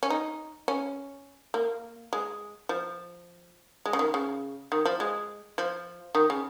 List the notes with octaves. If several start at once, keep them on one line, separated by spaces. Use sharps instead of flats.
C#4
D#4
C#4
A#3
G#3
F3
G#3
C#3
D#3
C#3
D#3
F3
G#3
F3
D#3
C#3